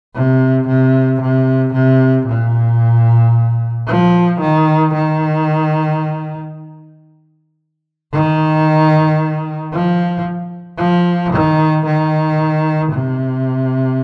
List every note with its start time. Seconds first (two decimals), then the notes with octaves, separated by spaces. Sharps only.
0.15 C3
0.68 C3
1.21 C3
1.74 C3
2.27 A#2
3.88 F3
4.40 D#3
4.94 D#3
8.13 D#3
9.73 F3
10.79 F3
11.33 D#3
11.86 D#3
12.91 C3